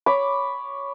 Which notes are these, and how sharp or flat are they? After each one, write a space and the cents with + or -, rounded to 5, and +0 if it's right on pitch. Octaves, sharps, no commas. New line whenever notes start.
C#5 +5 B5 +0 D6 +0